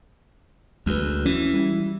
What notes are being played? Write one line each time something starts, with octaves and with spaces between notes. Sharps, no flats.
D2 G#3 F#4 B4
E3 C#4
G3 E4